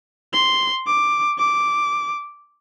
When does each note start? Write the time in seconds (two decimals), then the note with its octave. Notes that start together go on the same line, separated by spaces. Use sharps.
0.33 C6
0.87 D6
1.39 D6